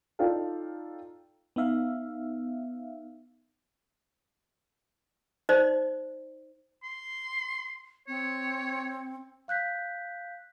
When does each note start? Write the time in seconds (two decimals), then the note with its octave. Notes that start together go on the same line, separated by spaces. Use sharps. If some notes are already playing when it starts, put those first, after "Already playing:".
0.19 D#4 F4 A4 D5 F5 G5
1.56 B3 D#4 E5 F5
5.49 D#4 C5 D5
6.83 C6
8.08 C4 C#5
9.48 F5 F#6 G6 B6